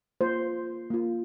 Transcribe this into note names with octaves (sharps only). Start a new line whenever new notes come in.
A#3 F4 C5
A#3 F4